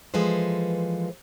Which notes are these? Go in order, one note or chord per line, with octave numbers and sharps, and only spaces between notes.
E3 F3 G#3 A4 B4 C5